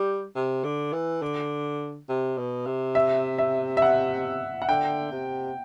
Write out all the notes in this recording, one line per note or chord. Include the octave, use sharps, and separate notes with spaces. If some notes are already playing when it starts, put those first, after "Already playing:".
Already playing: G3
C3
D3
E3
D3
C3
B2
C3
E5
E5
E5
F#5
F#5
D3 G5
C3